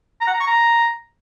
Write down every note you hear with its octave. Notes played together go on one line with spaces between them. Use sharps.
A#5
F#5
A#5
C#6
A#5